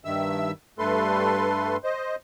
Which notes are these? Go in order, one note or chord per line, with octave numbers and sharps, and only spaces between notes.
G2 D#3 E5 E6
G2 A3 A4 B4 C6
C5 D#5